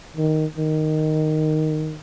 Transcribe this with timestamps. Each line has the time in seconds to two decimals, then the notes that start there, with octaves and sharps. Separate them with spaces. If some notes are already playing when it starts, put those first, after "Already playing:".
0.17 D#3
0.58 D#3